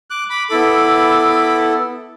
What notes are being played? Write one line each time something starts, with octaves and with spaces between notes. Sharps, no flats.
D6 F#6
B5 D6
B3 E4 A4 B5 D6